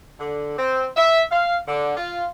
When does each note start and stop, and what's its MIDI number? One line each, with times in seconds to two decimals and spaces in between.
0.19 0.56 50
0.58 0.87 60
0.96 1.21 76
1.31 1.57 77
1.68 1.95 50
1.96 2.26 65